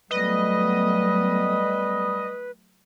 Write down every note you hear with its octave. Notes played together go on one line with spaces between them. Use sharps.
F#3 G3 A3 B3 B4 D#5